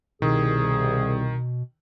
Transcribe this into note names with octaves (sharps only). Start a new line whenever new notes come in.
C2 B2 D#3 G#4